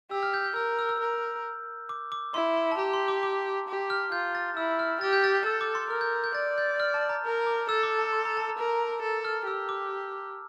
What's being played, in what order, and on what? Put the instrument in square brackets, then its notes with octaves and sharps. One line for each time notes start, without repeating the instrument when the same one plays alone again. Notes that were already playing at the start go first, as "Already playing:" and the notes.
[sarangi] G4 [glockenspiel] E6
[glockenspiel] F6
G6
G6
[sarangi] A#4 [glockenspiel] E6
[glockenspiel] E6
E6
[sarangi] A#4
[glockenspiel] D6
D6
[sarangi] E4 [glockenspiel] C6
[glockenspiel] C6
A5
[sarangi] G4 [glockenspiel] A#5
[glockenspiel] C6
D6
D6
[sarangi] G4
[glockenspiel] F6
[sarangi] F4 [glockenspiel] G6
[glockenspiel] A6
[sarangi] E4 [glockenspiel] E6
[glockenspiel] F6
[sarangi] G4 [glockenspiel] A6
[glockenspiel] G6
A6
G6
[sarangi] A4 [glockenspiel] E6
[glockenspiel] D6
C6
[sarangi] A#4 [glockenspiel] F6
[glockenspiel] G6
G6
[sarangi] D5 [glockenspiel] A6
[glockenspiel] G6
F6
A5
A#5
[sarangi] A#4
[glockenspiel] D6
[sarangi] A4 [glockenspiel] E6
[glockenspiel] D6
A5
C6
A#5
A5
A#5
[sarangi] A#4
A4
[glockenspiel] F6
[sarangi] G4 [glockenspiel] E6
[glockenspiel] D6